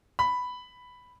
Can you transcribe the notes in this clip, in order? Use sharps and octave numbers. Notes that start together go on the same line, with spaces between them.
B5